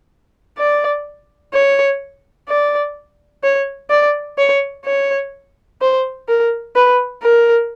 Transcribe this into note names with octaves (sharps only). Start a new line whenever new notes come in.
D5
C#5
D5
C#5
D5
C#5
C#5
C5
A#4
B4
A#4